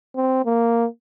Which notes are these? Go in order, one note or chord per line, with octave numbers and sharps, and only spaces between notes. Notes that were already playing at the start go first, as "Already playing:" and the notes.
C4
A#3